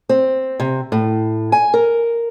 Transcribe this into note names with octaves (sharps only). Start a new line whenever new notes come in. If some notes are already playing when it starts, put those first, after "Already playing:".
C4
C3
A2
G#5
A#4